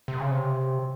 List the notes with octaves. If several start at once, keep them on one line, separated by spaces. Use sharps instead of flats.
C3
C#3
C3